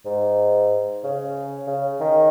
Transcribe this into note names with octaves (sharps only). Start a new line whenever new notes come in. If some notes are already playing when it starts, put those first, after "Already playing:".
G#2
C#3
C#3
D#3